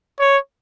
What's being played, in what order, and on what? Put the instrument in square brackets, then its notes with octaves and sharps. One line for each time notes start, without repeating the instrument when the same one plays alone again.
[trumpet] C#5